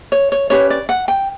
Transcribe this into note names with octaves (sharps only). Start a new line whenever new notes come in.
C#5
C#5
C#4 G4 B4 C#5
D5
F#5
G5